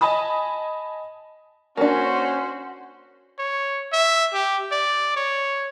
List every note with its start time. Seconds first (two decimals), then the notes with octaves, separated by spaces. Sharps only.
0.01 D#5 G#5 A5 B5 D#6
1.77 A#3 C#4 D4 F#4 C5
3.39 C#5
3.93 E5
4.33 G4
4.72 D5
5.17 C#5